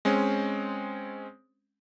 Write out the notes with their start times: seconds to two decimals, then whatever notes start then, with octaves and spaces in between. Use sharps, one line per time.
0.05 G#3 C4 C#4